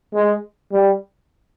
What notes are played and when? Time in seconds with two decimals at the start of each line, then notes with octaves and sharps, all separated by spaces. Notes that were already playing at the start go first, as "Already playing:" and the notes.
0.14 G#3
0.72 G3